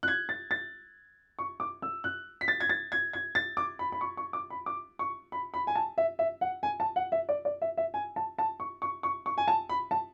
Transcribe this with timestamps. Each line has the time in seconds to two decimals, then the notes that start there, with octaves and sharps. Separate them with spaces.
0.03 F#6
0.08 G#6
0.29 A6
0.51 A6
1.39 C#6
1.60 D6
1.82 E6
2.04 F#6
2.41 B6
2.48 A6
2.60 G#6
2.69 A6
2.92 G#6
3.13 G#6
3.35 A6
3.57 D6
3.79 B5
3.92 B5
4.01 C#6
4.17 C#6
4.33 D6
4.50 B5
4.66 D6
4.99 C#6
5.32 B5
5.54 B5
5.67 G#5
5.75 A5
5.98 E5
6.19 E5
6.41 F#5
6.63 G#5
6.80 A5
6.96 F#5
7.12 E5
7.29 D5
7.45 D5
7.62 E5
7.77 E5
7.94 G#5
8.16 A5
8.38 A5
8.60 C#6
8.82 C#6
9.03 C#6
9.26 C#6
9.38 G#5
9.48 A5
9.69 B5
9.91 A5